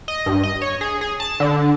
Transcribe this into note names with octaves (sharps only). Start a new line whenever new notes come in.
D#5
G2
D#5
C#5
G#4
G#4
A5
D3